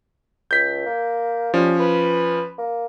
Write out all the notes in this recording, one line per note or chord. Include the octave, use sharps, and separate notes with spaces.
C#2 G6 B6
A#3
F3 G3 C#4
B4
A#3